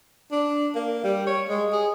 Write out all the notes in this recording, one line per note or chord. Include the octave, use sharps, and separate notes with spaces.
D4
A#3
G3
C#5
G#3
G#4